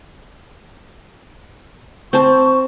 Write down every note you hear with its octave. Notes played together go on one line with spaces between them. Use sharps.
C4 A5 C#6